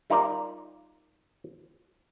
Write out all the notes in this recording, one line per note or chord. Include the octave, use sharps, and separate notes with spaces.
G3 D#4 F4 A#4 D5